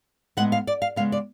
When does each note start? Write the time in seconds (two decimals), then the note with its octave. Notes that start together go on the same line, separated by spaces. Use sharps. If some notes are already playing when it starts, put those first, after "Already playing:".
0.37 A2 G#3 B3 F#5
0.52 F5
0.67 D5
0.82 F5
0.96 C#3 G#3 B3 F5
1.12 D5